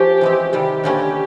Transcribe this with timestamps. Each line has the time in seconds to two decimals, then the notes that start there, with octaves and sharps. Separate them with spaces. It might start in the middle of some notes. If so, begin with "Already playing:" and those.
Already playing: F3 C#4 F4 G4
0.21 E3 G#3 C4
0.53 C3 D#3 G3 G4
0.84 D3 G3 A#3 C#4